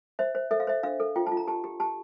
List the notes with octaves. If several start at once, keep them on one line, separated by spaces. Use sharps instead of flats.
C5 E5
C5
A4 E5
F5
C5 E5
D4 F5
A4
F4 G5
A5
F4
A#5
G4 A5
G4
G4 A5